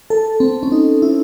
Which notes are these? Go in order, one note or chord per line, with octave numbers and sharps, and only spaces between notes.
A4
C4
C#4
D#4
E4